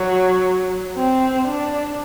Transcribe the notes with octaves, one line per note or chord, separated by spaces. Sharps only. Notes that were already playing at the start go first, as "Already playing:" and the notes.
Already playing: F#3
C4
D4